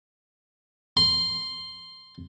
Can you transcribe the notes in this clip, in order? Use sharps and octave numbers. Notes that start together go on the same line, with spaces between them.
C6